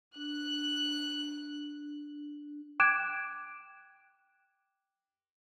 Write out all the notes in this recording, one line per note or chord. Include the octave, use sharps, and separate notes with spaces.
D4 F#6
G5 D6 F#6 G#6 D7 E7